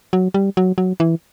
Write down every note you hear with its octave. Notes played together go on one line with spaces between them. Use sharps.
F#3
G3
F#3
F#3
E3